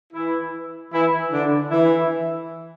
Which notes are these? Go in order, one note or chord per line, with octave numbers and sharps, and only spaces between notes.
E3 E4
E3 E4
D3 D4
E3 E4